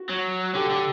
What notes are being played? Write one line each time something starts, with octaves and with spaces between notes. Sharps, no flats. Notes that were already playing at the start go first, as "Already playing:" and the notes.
Already playing: F#4
F#3
D3 G4
D3